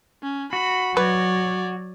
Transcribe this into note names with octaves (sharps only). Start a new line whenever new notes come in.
C#4
F#4 B5
F#3 B4 C#5 D5